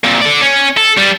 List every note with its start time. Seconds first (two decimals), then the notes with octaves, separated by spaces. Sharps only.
0.04 A#2 C4
0.21 A4 D5
0.41 C#4
0.77 A4
0.97 G3 D4